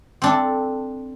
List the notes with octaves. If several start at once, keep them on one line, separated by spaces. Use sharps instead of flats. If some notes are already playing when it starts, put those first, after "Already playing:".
C4 D4 A4